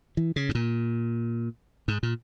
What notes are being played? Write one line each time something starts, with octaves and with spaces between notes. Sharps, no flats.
E3
C#3
G#2
A#2
G#2
A#2